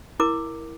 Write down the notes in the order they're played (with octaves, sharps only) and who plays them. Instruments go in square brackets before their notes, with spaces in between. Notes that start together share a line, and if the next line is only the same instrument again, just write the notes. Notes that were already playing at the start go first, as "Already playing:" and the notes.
[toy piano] E4 A#4 D6